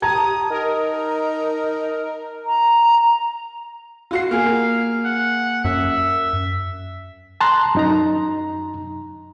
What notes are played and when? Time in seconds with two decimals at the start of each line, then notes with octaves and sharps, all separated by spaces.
0.02 G4 A5 A#5 D#6 G#6
0.50 D#4 A#4
2.45 A#5
4.11 F4 F#4 C7
4.31 A#3 G#4 F5
5.05 F#5
5.65 F#2 E5
7.41 A5 A#5 C6 F#6
7.75 F#2 D#4 A#5